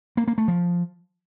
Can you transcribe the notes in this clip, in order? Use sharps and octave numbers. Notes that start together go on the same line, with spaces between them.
A#3
A#3
A3
F3